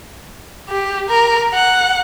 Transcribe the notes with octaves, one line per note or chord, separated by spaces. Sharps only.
G4
A#4
F#5